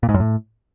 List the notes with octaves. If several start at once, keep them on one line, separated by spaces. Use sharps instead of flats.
A#2
G#2
F#2
A2